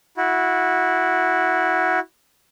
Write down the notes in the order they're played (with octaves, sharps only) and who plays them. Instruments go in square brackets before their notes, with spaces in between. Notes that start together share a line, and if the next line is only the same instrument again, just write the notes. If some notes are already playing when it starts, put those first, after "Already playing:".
[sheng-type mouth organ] E4 F#4